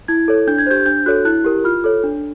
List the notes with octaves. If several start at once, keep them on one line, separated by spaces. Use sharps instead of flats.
E4 G#6
A4 C#5
D4 G6
G#6
G4 C5 G6
D4 G6
F#4 A4 C#5 F#6
E4 F#6
G4 A#4
F4 F6
A4 C#5
D4